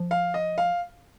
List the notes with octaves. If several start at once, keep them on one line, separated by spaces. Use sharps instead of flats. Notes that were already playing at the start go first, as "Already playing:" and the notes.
Already playing: F3
F5
D#5
F5